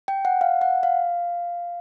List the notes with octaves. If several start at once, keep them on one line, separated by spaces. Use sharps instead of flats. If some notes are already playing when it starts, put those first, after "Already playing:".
G5
F#5
F5
F#5
F5